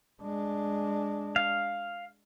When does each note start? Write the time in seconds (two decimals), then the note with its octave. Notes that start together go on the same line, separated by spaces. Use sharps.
0.22 G#3 D4
1.36 F5